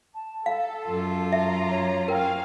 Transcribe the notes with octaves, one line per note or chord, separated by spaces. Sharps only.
A5
A4 F5
F#2 F4
E5 A#5
C#5
C#4 A#4 F5 G5